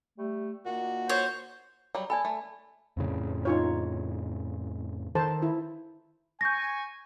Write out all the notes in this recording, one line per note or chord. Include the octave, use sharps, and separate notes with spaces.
G3 A3
A#2 D#3 A#3 F#4
C5 C#5
F#3 G3
A4 D5 G#5 B5
A3
F2 A2 C#3
D#4 F4 C#5
D#3 A4 C5 A5
E4
G#5 C#6 G6 A#6